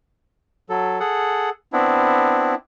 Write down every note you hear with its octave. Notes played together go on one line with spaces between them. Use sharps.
F#3 A4
G#4 A4 F#5
B3 C4 D4 E4